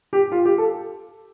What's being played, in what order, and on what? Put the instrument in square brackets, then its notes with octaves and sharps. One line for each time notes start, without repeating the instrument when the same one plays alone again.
[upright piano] G4
F4
G4
A4